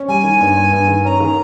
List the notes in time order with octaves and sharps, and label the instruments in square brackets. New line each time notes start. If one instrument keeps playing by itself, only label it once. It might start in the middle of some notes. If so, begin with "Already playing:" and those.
Already playing: [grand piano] C#4
[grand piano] G3 [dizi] G#5
[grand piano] D#3
G2
G2
G2
D#3
[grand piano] C#4 [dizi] A#5
[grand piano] D#3